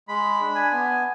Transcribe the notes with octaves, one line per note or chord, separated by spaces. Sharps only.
G#3 B5
D4
G#5
B3